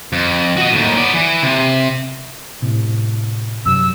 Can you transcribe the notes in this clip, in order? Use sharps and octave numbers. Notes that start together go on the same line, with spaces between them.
F2
F#4 D#5
D#2 A2
B3 D5
E3
C3
A2 C3
F#2 C3 F#3 E6